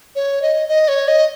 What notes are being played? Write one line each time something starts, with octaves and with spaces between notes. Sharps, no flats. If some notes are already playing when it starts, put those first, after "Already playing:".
C#5
D#5
D#5
C#5
D#5